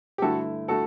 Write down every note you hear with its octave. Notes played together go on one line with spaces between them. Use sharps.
G4
G2 D3 A3 E4 F#4 A4
D3 A3 F#4 A4